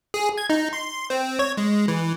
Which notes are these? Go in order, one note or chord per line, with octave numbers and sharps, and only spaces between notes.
G#4
G#6
D#4
C6
C4
C#5
G#3
E3